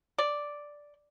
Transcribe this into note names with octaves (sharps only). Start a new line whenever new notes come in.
D5